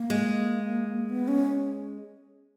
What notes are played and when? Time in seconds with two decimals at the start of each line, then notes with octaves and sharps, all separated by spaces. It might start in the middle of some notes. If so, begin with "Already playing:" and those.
Already playing: A#3
0.10 G#3
1.09 B3
1.28 C#4